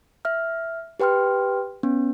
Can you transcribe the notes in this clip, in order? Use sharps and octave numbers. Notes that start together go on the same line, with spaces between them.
E5 F6
G4 B4 G5 C6 F6
B3 C#4